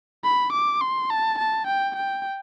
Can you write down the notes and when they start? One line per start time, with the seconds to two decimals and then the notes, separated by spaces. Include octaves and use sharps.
0.24 B5
0.53 D6
0.81 C6
1.11 A5
1.38 A5
1.67 G5
1.96 G5